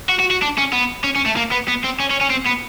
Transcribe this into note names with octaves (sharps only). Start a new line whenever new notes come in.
F#4
F#4
F#4
D4
C#4
B3
C#4
C#4
A3
A#3
B3
B3
C4
C#4
C#4
C#4
C4
B3